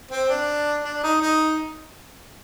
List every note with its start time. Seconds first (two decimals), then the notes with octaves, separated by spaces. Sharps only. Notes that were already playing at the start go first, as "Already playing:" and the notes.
0.11 C4
0.29 D4
0.84 D4
1.03 D#4
1.22 D#4